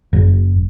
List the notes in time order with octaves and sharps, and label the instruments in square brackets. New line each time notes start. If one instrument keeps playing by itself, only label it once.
[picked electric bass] F#1